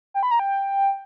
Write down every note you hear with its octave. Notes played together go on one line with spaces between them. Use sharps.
G5
B5
A#5
G5